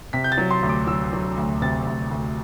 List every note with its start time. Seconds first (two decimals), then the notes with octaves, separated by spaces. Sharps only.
0.13 C3 B6
0.24 G6
0.32 A6
0.38 F#3
0.51 C6
0.63 D2
0.69 D6
0.87 F#3 E6
1.13 F#3
1.38 D2
1.62 C3 A6
1.86 D2
2.11 D2